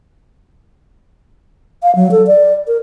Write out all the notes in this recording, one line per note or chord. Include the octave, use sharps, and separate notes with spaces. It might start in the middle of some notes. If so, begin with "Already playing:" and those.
F5
F#3
A4
D5
A#4